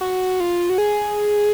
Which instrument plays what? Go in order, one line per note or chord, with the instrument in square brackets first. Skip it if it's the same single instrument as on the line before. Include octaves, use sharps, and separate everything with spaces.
[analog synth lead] F#4
F4
F#4
G#4